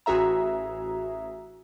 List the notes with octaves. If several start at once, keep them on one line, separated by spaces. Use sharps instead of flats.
A1 F#4 G#4 E5 A#5